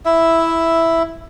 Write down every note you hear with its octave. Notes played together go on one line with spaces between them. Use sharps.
E4 E5